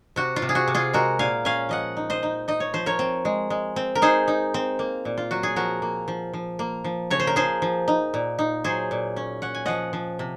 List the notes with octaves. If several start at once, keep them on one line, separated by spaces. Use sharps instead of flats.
C3 F#4
F4
C3
G#4
F#4
C3
F4 G#4
G#3 F#4 A#4
A#2 F5 G#5
C#4 F5 G#5
F3 D#5 F#5
D#4
C5 D#5
D#4
D#4 D#5
C#5
F3 C5
A#4 C#5
C4
G#3
G#3
C4
A#4
D#4 G#4 C5
D#4
C4
A#3
A#2
F4
F#3 F#4
G#4
F3 F#4 A#4
A#3
F3
F3
A#3
F3
C#3 C#5
C5
A#4
F3 G#4 C5
F3
D#4
A#2
D#4
F#3 G#4 C5
A#2
C#4
C#4 F#5
G#5
F3 D#5 F#5
F3
C3